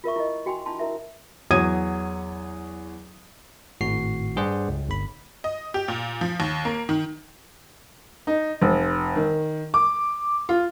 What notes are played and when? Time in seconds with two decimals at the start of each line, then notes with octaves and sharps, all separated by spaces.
0.04 F4 A#4 E5 C#6
0.16 E4 D#5
0.46 F#4 G5 G#5 C6
0.66 D4 E4 F4 A5 C6
0.79 E4 A#4 E5
1.51 E2 F#3 C#5 D#6 G#6 D#7
3.81 G#1 A2 F#4 C7
4.36 G2 G#4 C5 D5 F#5
4.69 C#2
4.89 G1 B5
5.44 D#5
5.74 G4
5.88 A#2
6.21 F3
6.40 D#2
6.65 A#3
6.89 D#3
8.27 D#4
8.62 F1
9.16 D#3
9.74 D6
10.49 F4